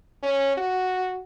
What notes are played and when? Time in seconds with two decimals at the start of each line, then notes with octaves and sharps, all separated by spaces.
0.23 C#4
0.57 F#4